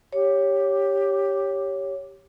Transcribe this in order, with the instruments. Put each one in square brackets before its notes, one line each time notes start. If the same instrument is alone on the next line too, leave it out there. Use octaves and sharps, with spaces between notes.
[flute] G4 [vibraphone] C#5